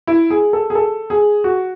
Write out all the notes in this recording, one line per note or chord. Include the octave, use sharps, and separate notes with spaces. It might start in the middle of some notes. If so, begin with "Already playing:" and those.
E4
G#4
A4
G#4
A4
G#4
F#4